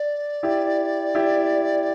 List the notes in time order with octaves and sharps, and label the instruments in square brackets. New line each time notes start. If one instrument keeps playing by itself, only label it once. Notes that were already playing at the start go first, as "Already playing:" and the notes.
Already playing: [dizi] D5
[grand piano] E4 G4
E4 G4